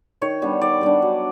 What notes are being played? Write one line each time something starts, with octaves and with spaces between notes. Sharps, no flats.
D#3 C#5
G3 B3 D4
D#3 D5
G3 B3 D4
F#3